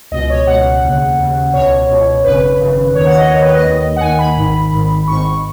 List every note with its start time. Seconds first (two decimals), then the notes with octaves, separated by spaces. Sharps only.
0.11 C#2 B2 D#5
0.30 C#5
0.47 C#2 B2 F#5
0.82 D#2 C#3
1.18 D#2 C#3
1.54 C#2 B2 C#5
1.89 C#2 B2
2.24 G#1 F#2 C#3 B4
2.59 G#1 F#2 C#3
2.95 D#2 D#3 C#5
3.07 F#5
3.18 D#5
3.30 D#2 D#3 C#5
3.42 B4
3.54 D#5
3.66 D#2 D#3
3.96 F#5
4.01 D#2 D#3 G#5
4.19 B5
4.36 G#1 G#2 D#3
4.72 G#1 G#2 D#3
5.07 G#1 G#2 D#3 C#6